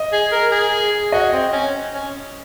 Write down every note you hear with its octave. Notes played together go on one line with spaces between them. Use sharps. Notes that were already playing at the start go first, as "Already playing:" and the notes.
Already playing: D#5
G#4
A#4
G#4
F#4 D#5
C4
C#4
C#4